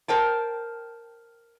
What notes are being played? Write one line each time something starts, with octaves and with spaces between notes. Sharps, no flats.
A#4 C5 G5 A5